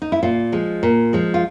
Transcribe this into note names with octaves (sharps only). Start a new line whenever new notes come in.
D#4
E4
A#2 F4
F3 G#3
A#2
F3 G#3
F4